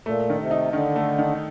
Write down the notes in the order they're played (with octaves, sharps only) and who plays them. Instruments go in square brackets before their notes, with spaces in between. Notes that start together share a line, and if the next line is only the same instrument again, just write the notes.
[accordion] A#2 [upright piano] A3
[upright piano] D#3
[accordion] C3
[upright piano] D#4
[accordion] D3 [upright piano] D#3
[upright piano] A3
D#3